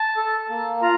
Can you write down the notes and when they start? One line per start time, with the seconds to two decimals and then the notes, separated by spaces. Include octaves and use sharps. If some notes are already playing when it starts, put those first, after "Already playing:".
Already playing: A5
0.17 A4
0.49 A#3
0.82 F4 A#5